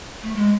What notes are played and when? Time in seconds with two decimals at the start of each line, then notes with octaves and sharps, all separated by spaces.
0.23 A3
0.36 G#3